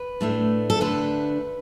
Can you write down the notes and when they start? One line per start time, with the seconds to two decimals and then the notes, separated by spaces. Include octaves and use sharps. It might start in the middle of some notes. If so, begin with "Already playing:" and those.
Already playing: B4
0.21 A2 A3 D4
0.70 A4
0.81 D2 D3 A3 D4 B4